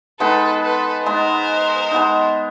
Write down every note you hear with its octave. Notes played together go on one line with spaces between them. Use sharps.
G#3 B3 D#4 A4 B4
A4 B4
G#3 B3 D#4 A#4 C5
G#3 B3 D#4